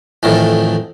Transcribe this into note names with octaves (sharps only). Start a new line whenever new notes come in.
F2 A2 D#3 E3